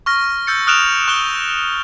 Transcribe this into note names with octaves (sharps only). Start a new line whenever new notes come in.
C#6 F6 A#6
E6 G6 A6 C#7
D#6 F6 F#6 D7 E7 F7
C#6 F#6 E7 G7